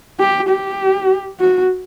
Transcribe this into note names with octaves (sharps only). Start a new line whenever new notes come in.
G4
G4
F#4